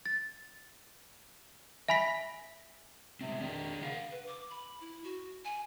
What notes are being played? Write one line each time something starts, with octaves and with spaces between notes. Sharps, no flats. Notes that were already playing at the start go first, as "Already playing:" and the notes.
A6
E5 G#5 B5 A#6 B6
C3 G3 G#3 C4
D#3 D4 G#4 D#5
C#3 A#4 F5 F#5
B4
D6
B5
E4
F#4
G#5